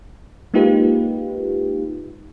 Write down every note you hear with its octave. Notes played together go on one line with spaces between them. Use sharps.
G#3 A#3 D#4 F4 G4 B4